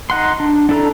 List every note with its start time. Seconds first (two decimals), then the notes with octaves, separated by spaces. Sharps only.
0.10 D#4 F#5 C6
0.40 D4
0.69 D4 E4 A4 D5 A#5